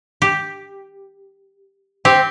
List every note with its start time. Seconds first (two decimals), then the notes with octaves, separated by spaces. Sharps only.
0.22 G4
2.05 C4 G4